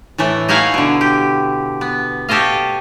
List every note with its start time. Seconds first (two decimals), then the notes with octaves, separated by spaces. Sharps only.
0.18 A2 E3 A3
0.48 D#4 E4 C#5 F5 F#5 G#5
0.74 B2 D3
1.01 G4
1.81 B3
2.29 G4 A4 C#5 D#5 F5